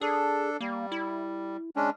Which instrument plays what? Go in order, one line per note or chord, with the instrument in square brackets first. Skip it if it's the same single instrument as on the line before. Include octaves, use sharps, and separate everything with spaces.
[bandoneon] D4 A4 [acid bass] G#4
[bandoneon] G3 [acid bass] A#3
[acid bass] E4
[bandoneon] G#3 C#4 D4